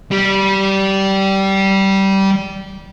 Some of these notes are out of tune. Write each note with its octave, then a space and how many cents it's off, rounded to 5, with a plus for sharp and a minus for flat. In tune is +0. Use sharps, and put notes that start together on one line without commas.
G3 -15